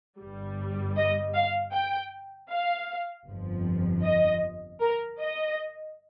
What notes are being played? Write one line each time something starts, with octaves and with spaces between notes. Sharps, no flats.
G1 G2 G3
D#5
F5
G5
F5
G1 F2 F3
D#5
A#4
D#5